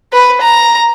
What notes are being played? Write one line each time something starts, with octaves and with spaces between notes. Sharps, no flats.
B4
A#5